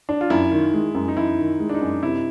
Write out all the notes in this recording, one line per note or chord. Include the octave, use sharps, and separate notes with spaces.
D4
F4
F#2 E4
D#3
G#3
F#2
D#4
F#2 E4
D#3
G#3
D4
D#4
F#2
C3 E4